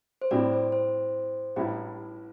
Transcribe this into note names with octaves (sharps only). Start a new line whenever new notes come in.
C5
A2 G3 C4 D5
C5
C5
A1 A2 G3 E4 G4